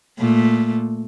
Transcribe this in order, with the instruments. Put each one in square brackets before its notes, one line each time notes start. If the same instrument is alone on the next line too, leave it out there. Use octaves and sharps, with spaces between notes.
[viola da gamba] A#2 A3